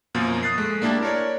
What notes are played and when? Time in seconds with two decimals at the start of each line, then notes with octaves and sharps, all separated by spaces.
0.15 F#2 B2 F3 A#3
0.43 D#6 F#6 A6 C7
0.58 G#3 A3
0.82 A#3 D4 E4 G4 A5
1.02 A#4 C#5 D5